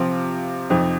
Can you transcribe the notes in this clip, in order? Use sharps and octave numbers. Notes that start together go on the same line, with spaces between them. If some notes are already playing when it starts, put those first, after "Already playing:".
Already playing: C3 F3 C4 F4
F2 C3 F3 C4 D#4